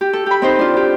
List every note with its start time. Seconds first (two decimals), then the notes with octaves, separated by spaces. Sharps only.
0.01 G4
0.13 A4
0.26 G4 B5
0.42 C4 D#4 C5
0.59 D4 F4
0.77 G4